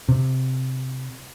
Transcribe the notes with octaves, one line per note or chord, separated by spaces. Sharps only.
C3